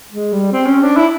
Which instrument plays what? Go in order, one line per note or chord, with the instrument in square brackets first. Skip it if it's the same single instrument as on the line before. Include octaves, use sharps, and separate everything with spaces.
[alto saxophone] G#3
G3
C4
C#4
D4
E4